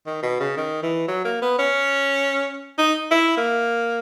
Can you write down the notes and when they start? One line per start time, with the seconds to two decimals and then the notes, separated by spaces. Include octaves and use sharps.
0.06 D#3
0.23 B2
0.40 C#3
0.57 D#3
0.83 E3
1.08 F#3
1.25 A#3
1.42 B3
1.59 C#4
2.78 D#4
3.11 E4
3.37 A#3